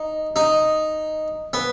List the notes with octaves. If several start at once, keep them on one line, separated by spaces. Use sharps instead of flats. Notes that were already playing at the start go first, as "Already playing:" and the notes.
Already playing: D#4
D#4
B3